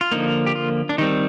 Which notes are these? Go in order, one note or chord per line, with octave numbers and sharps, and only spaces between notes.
F4
D3 F3 A#3 D#4
G4
F4
D4
D#3 G3 C4 D#4